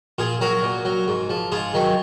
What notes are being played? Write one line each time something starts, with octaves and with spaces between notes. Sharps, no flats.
A#2 F4 G#4
F#3 F#4 A#4
A#2
F#3
G#2
F3
G#2 F4 G#4
D#3 F#3